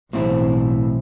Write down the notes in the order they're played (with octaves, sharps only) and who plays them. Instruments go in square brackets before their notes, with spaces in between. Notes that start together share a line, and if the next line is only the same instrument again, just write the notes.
[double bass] B1 [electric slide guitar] A2 C4 E4 [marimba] E3 F#3 C5